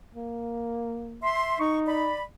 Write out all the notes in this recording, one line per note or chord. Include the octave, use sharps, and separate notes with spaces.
A#3
E5 C6
D#4 C#6
D5 B5